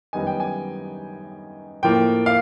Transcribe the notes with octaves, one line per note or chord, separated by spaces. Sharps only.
F#2 D#3 G3 B3 D#4 G#5
G5
G#5
A2 F3 A#3 G5
F5